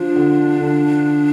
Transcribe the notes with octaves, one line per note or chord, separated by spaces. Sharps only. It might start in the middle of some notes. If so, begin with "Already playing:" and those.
Already playing: F3 D4
D3
D3